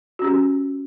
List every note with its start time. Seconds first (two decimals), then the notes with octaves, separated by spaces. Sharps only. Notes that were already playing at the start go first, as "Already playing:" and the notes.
0.19 F#4
0.22 C#4
0.24 G4